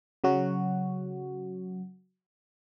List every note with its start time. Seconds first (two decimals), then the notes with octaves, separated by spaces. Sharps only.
0.24 C#3 F#3 F#4